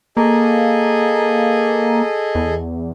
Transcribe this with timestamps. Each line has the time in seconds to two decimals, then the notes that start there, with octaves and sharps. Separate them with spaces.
0.17 A#3 G#4 A4 D#5
2.35 E2